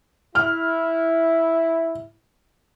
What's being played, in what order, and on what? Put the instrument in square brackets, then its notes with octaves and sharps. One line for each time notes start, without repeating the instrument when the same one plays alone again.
[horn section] E4 [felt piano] F6